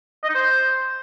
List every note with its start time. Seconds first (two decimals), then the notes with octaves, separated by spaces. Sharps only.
0.23 D#5
0.29 D#4
0.35 C5